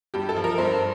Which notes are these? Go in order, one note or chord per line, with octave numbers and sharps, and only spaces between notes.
G2 G4
A4
F3
A#4
G2 C5